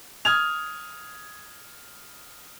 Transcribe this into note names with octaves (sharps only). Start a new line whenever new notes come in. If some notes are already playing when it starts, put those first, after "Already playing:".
D#6 F6 G#6 F7